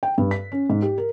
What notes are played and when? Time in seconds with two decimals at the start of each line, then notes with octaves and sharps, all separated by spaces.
0.03 G5
0.18 G2
0.31 B6
0.52 C#4
0.70 G#2
0.82 G4
0.98 A#4